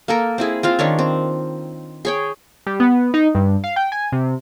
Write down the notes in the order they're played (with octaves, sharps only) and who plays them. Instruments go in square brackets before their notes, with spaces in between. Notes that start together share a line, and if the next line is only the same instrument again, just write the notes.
[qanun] A#3 A4 A#4
C4 E4 G#4
C4 F4 F5
D#3 C#4 D4 C#5
C4
G#4 C#5 G5
[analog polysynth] G3
B3
D#4
G2
F5
G5
G#5
C3